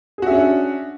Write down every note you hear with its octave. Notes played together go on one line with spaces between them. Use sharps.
C#4 D4 F#4 G#4 E5